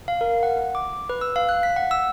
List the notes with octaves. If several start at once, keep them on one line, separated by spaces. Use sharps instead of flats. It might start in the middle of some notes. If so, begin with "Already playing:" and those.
F5
A#4
F#5
D6
B4
E6
F5
F#6
B6
F#5
E6